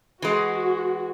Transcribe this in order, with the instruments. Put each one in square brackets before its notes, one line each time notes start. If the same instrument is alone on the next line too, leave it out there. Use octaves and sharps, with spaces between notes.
[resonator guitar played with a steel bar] E3 G#3 [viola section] F#4